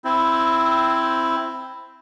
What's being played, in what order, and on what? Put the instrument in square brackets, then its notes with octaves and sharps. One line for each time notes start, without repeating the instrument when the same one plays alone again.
[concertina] C4 E4